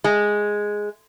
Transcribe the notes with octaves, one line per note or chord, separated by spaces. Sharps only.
G#3